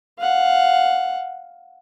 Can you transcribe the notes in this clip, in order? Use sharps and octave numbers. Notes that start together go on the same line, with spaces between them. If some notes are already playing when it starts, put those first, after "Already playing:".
F5 F#5